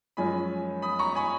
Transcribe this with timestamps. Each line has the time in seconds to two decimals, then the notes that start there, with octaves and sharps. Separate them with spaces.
0.17 F#2 F3 G#3 C#4 G#5 B5
0.82 B5 D#6
0.99 A#5 C#6
1.15 G#5 B5